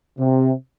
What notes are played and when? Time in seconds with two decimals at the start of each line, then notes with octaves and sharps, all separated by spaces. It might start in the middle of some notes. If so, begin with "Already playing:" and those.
0.18 C3